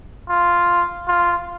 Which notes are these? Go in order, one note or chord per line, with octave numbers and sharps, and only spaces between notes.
F4
F4